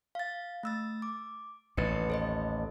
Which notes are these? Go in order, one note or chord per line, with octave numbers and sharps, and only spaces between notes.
F5 A6
A3 E6 A6
D6
A1 D#2 B4 A6 C#7
A4 C5 D#5